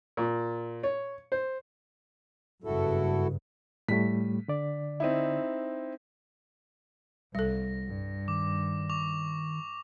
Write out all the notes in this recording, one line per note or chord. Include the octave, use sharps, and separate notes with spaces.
A#2
C#5
C5
F#1 G2 C#3 E4 F#4 A4
A2 G3 A3 B6
D3 D5
C4 D#4 E4
C2 G3 A4 A#6
G2
D#3 D6
C#6 D6 F7